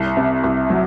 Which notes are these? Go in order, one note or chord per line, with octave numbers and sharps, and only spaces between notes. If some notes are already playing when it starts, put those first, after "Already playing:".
Already playing: C2
C3
C2
F#3